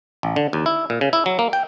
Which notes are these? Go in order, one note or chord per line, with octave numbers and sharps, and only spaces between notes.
A1
D3
D#2
E4
A#2
C#3
E4
F#3
A#3
G5